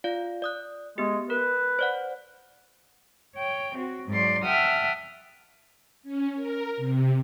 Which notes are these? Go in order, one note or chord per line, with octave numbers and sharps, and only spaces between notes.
F4 D5 F5
D5 D#6 F#6
G#3 B3 G4
A#4 B4
C5 D5 F#5
C#5 G5
C4 F#4
G#2 F#3 D5 C6
E5 F#5 G5 A5 D#6 F6
C#4
A#4
C3